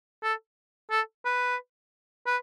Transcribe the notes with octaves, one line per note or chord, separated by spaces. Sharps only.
A4
A4
B4
B4